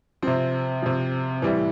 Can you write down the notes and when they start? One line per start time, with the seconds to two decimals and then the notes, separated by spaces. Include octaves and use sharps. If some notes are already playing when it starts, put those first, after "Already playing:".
0.22 C3 F3 C4
0.82 C3 F3
1.42 A2 E3 G3